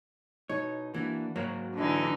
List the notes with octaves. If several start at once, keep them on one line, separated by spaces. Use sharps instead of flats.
B2 D#4 C#5
E3 A#3 D4 F#4
G#2 F#3 A#3 F#4
D3 E3 D#4